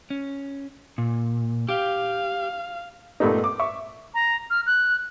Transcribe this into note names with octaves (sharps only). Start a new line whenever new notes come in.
C#4
A#2
G4 F5
G2 A#2 A3 B3 D#4
D6
E5 C#6
A#5
F6
F#6